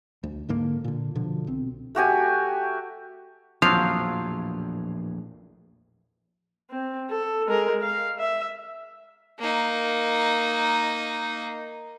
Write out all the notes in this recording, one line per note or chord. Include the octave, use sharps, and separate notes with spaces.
D2
G#2 D3 A#3
A#2 D3
B2 D3 F3
B1 C4
A3 F#4 G4 G#5
A#1 E2 A2 F3 F#3 F5
C4
A4
G#3 A#4
F5
E5
A#3 D#4